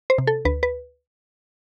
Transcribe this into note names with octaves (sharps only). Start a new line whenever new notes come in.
C5
C3
A4
D2 B4
B4